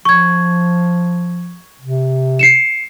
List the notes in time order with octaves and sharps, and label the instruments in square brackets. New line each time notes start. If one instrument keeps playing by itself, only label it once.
[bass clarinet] F3 [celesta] C#6 G#6
[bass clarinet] C3
[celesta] C7 C#7 E7